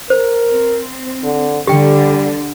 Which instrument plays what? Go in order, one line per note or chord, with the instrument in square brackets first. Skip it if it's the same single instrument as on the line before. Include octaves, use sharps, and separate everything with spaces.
[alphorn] A#4 [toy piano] C5
[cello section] C4
[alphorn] D3
[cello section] D3 [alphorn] G3 [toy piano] G4 G5